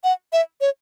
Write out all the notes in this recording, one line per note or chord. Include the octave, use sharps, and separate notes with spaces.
F#5
E5
C#5